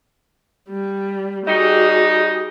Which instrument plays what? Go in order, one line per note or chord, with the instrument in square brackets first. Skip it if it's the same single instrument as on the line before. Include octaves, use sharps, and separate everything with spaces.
[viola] G3
[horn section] G3 D#4 [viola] F#4 G#4